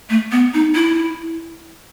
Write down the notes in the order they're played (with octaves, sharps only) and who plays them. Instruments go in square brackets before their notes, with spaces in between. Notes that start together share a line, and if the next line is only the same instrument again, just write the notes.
[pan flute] A3
B3
D#4
E4